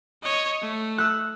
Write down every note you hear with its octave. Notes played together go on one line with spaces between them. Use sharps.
C#5 D#5
A3
E6 F#6